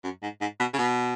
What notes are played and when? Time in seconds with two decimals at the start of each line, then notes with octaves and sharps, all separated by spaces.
0.03 F#2
0.22 G#2
0.41 G#2
0.59 B2
0.73 C#3
0.78 B2